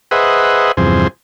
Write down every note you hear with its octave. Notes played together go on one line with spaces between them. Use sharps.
G#4 B4 C5 D#5 E5 F#5
E2 G2 C3 F3 G#4 C5